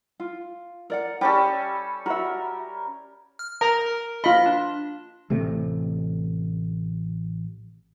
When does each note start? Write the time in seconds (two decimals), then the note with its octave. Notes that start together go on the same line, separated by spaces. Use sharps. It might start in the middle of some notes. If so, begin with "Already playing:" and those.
0.20 F4
0.90 A#4 D5 F#5
1.21 G3 C#4 G4 A4
2.06 F#4 A#4 E5
3.39 F6
3.61 A#4 A#5
3.86 A#4
4.24 F4 D#5 B5
4.46 D4
5.30 A1 C3 A3